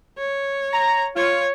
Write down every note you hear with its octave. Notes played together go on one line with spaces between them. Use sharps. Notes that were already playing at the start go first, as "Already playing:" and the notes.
C#5
A#5
F4 C#5